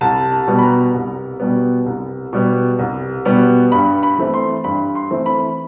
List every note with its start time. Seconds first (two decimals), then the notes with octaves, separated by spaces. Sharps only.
0.01 C2 A5
0.32 A5
0.47 B2 G3 B3
0.59 B5
0.63 A#5
0.94 C2
1.39 B2 G3 B3
1.86 C2
2.33 B2 G3 B3
2.79 C2
3.25 B2 G3 B3
3.72 G2 B5
4.03 B5
4.18 E3 A3 C4
4.34 C6
4.64 G2 B5
4.95 C6
5.10 E3 A3 C4
5.26 B5